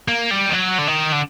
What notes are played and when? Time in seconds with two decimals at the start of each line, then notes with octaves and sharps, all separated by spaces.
0.08 A#3
0.31 G3
0.50 D#3
0.53 F#3
0.78 D3
0.87 D#3
1.12 D3